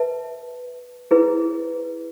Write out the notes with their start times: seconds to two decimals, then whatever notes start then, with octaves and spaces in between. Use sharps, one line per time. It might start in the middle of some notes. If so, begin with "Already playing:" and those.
Already playing: B4 E5 A5
1.11 E4 G#4 B4